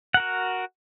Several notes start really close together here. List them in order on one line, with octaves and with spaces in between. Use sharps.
F#5 A#4 F#4